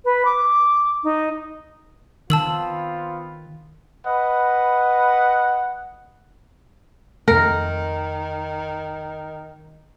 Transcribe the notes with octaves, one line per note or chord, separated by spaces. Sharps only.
B4
D6
D#4
D#3 B3 C4 F4 A5 E6 F#7
B4 D#5 F#5
F2 D#3 A3 A#4